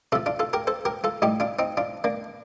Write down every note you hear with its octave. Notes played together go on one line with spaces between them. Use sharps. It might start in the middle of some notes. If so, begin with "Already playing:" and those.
C3 F3 F4 A4
D4 F4
F4 A4
G4 A#4
A4 C5
G4 A#4
F4 A4
A2 G3 D#4 G4
D4 F4
C4 D#4
D4 F4
A#3 D4